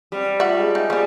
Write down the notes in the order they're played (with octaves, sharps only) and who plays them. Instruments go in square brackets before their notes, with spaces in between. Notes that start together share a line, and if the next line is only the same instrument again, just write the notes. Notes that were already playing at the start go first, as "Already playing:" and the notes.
[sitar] G3 [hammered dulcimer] C4 F#5
[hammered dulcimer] A3 F4 [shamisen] E5 F#5
[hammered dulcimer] G#3 C4 G#4
[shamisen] D#4
[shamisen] F3 A#3 [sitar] G3